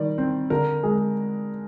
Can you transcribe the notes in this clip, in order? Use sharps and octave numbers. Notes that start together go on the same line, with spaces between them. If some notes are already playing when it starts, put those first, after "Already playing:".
Already playing: D#3 G3 D5
C4
D3 A#4
G#3 G#4